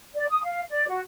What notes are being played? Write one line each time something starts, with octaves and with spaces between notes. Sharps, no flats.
D5
D#6
F5
D5
F#4